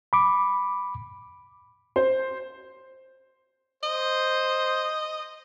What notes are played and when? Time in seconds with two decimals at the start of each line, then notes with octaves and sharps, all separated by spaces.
0.13 B5 D6
1.96 C5
3.83 C5 D#5